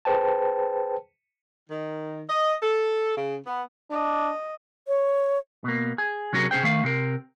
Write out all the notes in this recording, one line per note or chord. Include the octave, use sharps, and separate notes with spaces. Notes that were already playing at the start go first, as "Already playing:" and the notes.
G#4 B4 C5 G5 A5
D#3
D#5
A4
C#3
B3
D4 D#5
C#5
B2 A#3
G#4
C3 F#3 C#4 F#4 G#4 A#4
C3 C#4 G#4 C5 G5
D#3 A3 F5
C3 C4 A#4